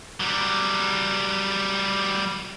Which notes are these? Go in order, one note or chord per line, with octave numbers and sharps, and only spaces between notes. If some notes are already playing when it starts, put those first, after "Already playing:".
F#3 G3